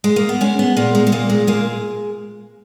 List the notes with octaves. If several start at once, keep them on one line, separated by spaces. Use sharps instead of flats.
G#3
A#3
B3
G#3 C#4
B3
A#2 A#3
G#3
G#3
A#2 A#3
G#3
G#3 A#3